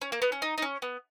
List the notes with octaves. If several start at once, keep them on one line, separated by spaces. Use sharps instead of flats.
C#4
A#3
B3
C#4
D#4
D#4
C#4
B3